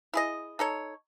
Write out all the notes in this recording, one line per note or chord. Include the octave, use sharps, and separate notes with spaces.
E4 G#4 D#5
D#4 A4 C#5